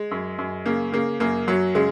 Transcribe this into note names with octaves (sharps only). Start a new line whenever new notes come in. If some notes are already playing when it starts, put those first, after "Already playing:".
Already playing: G#3
F#2
F#2
C#3 A#3
C#3 A#3
F#2 A#3
F#2 F#3
C#3 G#3